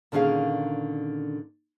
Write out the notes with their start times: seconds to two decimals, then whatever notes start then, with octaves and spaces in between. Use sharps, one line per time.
0.12 A#2 D3 D#3 C#4 G#4 F5